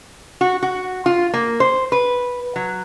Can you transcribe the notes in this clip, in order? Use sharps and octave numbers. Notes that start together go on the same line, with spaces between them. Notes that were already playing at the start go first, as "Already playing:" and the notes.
F#4
F#4
F4
A#3
C5
B4
F#3